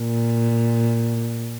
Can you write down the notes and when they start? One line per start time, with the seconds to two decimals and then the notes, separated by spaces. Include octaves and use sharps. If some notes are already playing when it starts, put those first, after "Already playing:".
Already playing: A#2